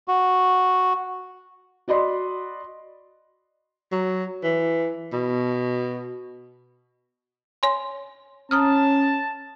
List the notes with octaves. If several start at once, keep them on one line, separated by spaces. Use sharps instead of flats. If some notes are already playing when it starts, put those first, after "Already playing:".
F#4
F#4 D5 D#5 B5 C6
F#3
E3
B2
C#5 G#5 C6
C#4 A5 A#5 D#6 F6